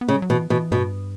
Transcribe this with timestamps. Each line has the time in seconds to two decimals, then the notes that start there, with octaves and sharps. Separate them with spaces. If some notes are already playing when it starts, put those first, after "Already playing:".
0.01 B3
0.08 C#3 A3
0.15 G3
0.22 F#3
0.30 B2 E3
0.50 B2 E3
0.71 G2 B2